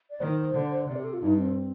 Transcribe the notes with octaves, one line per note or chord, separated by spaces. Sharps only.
D5
D#3 C5
D3
C3 D5
G4
A4
F4
G2 D#4
C4